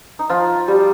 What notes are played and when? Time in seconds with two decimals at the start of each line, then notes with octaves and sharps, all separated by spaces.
0.19 D#4
0.30 F3 F4
0.68 G3 G4